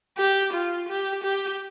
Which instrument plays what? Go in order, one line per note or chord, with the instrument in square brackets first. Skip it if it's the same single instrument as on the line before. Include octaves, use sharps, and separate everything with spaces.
[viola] G4
F4
G4
G4